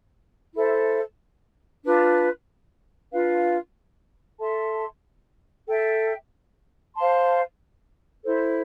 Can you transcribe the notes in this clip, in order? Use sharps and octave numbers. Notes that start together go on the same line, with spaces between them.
E4 A4 C5 E5
D4 F4 B4
D4 F4 B4 F5
A4 E5 A5 C6
A4 E5 G5
C5 F5 A5 C6
E4 A4 C5